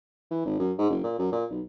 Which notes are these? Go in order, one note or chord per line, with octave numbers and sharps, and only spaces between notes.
E3
G#1
F#2
G#2
F#1
A#2
F#2
A#2
B1